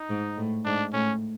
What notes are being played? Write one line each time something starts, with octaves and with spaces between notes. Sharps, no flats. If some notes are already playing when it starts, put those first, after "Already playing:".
Already playing: D#4
G#2
A2
G#2 D4
A2 C#4